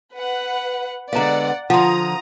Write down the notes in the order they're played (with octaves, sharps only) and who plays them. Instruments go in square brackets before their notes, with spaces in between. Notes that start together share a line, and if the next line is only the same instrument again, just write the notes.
[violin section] B4 F#5
[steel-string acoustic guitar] D3 G#3 B3 [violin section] D5 F#5 [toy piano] F5 A#5
[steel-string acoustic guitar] D3 F3 [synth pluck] F4 [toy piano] F#5 C6 [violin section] A#5 D#6